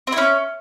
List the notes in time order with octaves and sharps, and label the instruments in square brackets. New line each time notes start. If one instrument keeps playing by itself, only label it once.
[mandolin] C4
E4
C#4